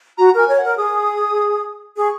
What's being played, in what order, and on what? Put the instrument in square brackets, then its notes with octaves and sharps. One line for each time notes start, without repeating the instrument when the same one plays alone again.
[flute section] F#4 [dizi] A#5
[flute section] A#4 [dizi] G#5
[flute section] C#5
[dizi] F#5
[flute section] A#4
[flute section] G#4 [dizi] D#6
[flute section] G#4 [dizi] D#6
[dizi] C#6